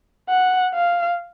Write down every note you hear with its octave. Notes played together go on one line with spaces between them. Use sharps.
F#5
F5